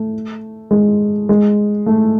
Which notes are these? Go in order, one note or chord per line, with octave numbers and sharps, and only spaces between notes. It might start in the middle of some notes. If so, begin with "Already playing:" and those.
Already playing: A3
G#3
G#3
A3